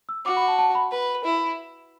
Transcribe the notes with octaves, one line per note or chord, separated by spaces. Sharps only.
E6
F#4 D6
B5
A5
A5
B5
B4 B5
E4